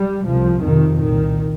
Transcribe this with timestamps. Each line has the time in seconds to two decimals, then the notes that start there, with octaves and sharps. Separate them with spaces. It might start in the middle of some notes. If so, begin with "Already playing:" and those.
Already playing: G3
0.24 C2 C3 F3
0.62 F2 C3 D#3
0.99 C2 A#2 D#3